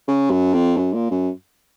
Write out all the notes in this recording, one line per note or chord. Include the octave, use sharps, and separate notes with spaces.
C#3
F#2
F2
F#2
A#2
F#2